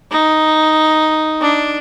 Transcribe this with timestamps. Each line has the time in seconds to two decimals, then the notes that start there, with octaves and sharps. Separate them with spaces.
0.11 D#4
1.41 D4